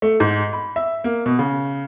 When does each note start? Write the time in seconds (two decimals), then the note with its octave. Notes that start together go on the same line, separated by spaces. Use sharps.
0.02 A3
0.20 G#2
0.53 B5
0.76 E5
1.04 A#3
1.26 B2
1.39 C#3